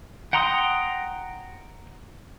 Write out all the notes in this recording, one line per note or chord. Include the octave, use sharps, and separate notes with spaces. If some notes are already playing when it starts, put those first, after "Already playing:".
F#5 G5 A#5 C6 D#6